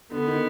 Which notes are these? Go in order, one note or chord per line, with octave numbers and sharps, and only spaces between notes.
D3 B3
D#3